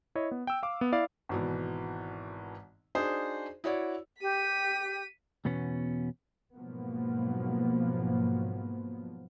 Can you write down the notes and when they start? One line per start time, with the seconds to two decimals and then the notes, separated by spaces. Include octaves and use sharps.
0.15 E4 C#5 D#5
0.31 B3
0.47 G5 E6
0.63 F5 D6
0.81 B3
0.92 E4 D5 F5
1.29 G#1 B2 E3
2.95 D4 D#4 F#4 G#4 C5
3.64 E4 F#4 C#5 D5
4.21 G4 B6 D#7
5.45 E2 B2 B3 C#4
6.53 G#2 B2 F3 F#3 A#3 B3